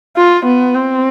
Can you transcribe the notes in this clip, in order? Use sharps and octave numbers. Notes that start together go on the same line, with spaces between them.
F4
B3
C4